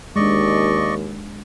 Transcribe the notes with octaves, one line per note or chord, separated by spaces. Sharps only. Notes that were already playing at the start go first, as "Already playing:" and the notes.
D#2 G#3 D4 D5 D#5 C#6